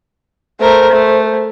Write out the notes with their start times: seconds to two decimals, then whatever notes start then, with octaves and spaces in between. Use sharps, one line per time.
0.60 A3 A#4 C5
0.91 A3